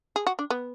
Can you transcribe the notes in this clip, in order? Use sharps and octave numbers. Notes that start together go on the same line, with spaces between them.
G#4
F#4
D4
B3